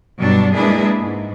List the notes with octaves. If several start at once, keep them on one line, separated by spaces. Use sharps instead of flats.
G2 B2 F#3 G3 D4
G#3 A#3 D4 E4 G#4 B4
G#2